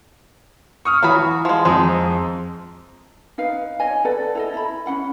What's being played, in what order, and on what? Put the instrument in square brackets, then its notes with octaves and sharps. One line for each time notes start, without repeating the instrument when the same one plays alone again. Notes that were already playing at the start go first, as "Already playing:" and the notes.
[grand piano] C#6 D#6 F6
[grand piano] E3 [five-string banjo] F#3 F#4 B5
[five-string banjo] F3 G#3
[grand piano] F2 [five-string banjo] F3 G#3 D#4
[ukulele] D#4 B4 F5
C#5 D#5 G#5
A4 B4 D5 F#5
E4 A4 D#5
E4 B5
C#4 D4 F#5 B5